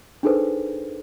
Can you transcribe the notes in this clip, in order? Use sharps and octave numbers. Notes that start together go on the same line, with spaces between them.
D4 D#4 G#4 A4 B4 C5